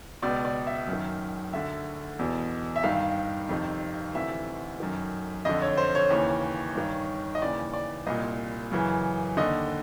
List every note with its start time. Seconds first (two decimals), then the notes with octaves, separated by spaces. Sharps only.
0.22 C#2 B2 D5
0.45 D5
0.67 E5
0.87 F#2
0.93 D#3
1.53 D2 D3 E5
2.19 E2 B2
2.76 E5
2.83 G2 D#3 F5
3.49 F2 C3 D#3
4.15 D2 C3 E3 E5
4.80 F#2 D#3
5.45 F2 D3 D#5
5.62 C#5
5.77 C5
5.95 C#5
6.10 D#2 C#3 E3
6.76 G2 D#3
7.35 D#5
7.41 D#2 C#3 E3 D5
7.73 D5
8.07 C2 A#2 D#5
8.71 F#2 C#3 E3
9.37 D#2 D3 D#5